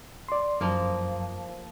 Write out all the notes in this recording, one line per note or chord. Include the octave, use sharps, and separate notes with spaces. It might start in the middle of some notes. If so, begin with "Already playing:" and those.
D5 C6
F#2 F3 A#3